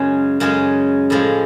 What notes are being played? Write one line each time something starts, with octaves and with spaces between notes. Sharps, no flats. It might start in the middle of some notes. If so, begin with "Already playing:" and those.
Already playing: F#2 C#3 G#3 C#4
F#2 C#3 G#3 C#4
A2 F3 G#3